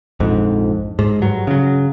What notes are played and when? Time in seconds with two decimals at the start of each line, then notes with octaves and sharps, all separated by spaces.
0.20 A#1 F2 G#2
0.99 G#2
1.22 G2 F#3
1.47 C#3 F#3